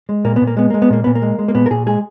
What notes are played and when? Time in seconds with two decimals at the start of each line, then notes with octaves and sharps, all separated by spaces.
0.09 G#3
0.25 A#2 A#3
0.36 B3
0.41 A#2
0.47 A#3
0.57 G#3 B3
0.70 G#3 A#3
0.82 B3
0.90 A#2 A#3
1.04 A#2 B3
1.15 A#3
1.22 G#3
1.39 G#3
1.48 A#3
1.55 A#2 B3
1.66 A#4
1.71 A#2 G#4
1.86 G#3 G#4